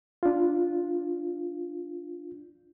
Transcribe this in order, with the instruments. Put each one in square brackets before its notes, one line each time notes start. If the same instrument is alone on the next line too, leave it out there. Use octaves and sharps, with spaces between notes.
[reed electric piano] D4 F4